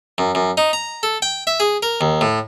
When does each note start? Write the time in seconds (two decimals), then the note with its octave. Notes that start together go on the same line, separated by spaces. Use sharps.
0.18 F#2
0.35 F#2
0.57 D#4
0.73 A#5
1.03 A4
1.22 G5
1.47 E5
1.60 G#4
1.83 A#4
2.01 D#2
2.21 A2